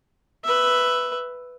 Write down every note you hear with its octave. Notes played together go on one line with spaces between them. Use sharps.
B4 E5